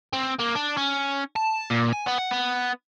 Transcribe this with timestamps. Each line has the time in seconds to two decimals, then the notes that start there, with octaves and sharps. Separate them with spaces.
0.13 C4
0.39 A#3
0.55 D4
0.77 C#4
1.36 A5
1.70 A#2
1.93 G#5
2.06 B3
2.18 F#5
2.31 B3